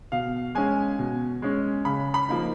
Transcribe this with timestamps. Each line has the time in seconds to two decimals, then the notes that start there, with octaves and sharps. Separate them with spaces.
0.12 B2 F5
0.55 G#3 C#4 G#5
0.99 B2
1.42 G#3 C#4
1.85 C#3 B5
2.14 B5
2.29 F3 A#3 D#4